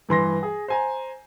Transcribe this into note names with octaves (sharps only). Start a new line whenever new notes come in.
G2 E3 C6 A#6
G#4
C5 G#5 A#5